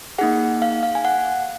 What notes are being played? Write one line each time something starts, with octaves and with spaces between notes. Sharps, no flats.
A#3 D#4 G#4 F#5
F5
F5
G#5
F#5